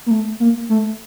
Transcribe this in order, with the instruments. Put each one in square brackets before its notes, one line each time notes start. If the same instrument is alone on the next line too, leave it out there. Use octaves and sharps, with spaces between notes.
[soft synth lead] A#3
A3
A#3
A3